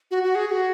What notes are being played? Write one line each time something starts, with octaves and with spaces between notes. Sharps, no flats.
F#4
F#4
G#4
G#4
F#4